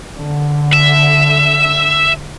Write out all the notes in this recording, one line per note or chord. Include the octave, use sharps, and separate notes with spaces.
D3
E5